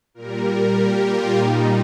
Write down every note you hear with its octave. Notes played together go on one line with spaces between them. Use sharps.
A#2 G3 A#4
A#4
G4
F4
A#2 G3 D#4